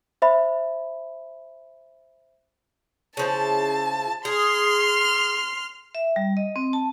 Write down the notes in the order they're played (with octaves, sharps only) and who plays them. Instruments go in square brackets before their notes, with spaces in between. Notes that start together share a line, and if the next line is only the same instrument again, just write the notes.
[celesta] C5 E5 B5
[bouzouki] C#3 F3 E4 [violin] A5
[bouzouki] G#4 [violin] C6 F6
[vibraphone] E5
G3
D#5
C4
A5